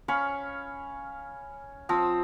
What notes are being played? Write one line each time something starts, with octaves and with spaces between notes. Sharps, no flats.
C#4 F5 B5 C#6
F3 C4 D#6